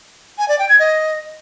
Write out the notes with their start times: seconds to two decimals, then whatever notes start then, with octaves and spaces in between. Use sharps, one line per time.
0.38 G#5
0.49 D5
0.59 G5
0.69 G#6
0.79 D#5